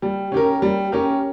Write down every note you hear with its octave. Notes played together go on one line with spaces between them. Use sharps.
G3
C#4 G4 A#4
G3
C#4 G4 A#4